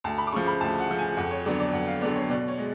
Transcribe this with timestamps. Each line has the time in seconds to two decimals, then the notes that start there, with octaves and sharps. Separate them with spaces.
0.04 D2 A5
0.18 B5
0.27 D6
0.32 C#3 F3 C#6
0.47 B5
0.61 D2 A5
0.80 F#5
0.89 C#3 F3
0.99 G#5
1.17 F2 F#5
1.31 C#5
1.46 D3 F#3 B3 D5
1.59 D5
1.73 F2 F#5
1.88 F5
2.01 D3 F#3 B3 D5
2.16 C#5
2.29 B2 D5
2.48 C#5
2.59 G#3